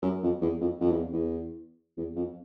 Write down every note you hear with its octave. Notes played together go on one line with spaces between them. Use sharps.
F#2
F2
E2
F2
F2
E2
E2
E2
F2